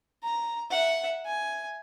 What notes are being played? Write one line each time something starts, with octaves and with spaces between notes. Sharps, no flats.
A#5
E5 F#5
G#5